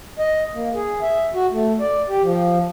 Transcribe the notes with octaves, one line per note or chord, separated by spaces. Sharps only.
D#5
A#3
G#4
E5
F#4
A3
D5
G4
F3